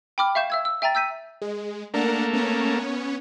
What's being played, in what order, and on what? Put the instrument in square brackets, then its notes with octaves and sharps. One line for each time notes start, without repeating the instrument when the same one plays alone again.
[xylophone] G5 B5 D6 F6
E5 F5 C#6 G6 E7
E5 E6 G#6
E6
E5 G5 G#5 A#5 A6
E6 G6 B6 D#7
[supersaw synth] G#3
[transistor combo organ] A3 A#3 [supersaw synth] D4 A#4 F#5
[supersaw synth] B3 C#4 C#5